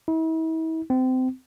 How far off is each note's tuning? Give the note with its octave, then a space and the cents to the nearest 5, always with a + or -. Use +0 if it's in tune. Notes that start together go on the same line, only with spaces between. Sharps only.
E4 -40
C4 -30